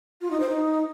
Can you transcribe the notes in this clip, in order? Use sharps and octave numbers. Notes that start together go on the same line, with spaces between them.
F4
D#4
C5
D#4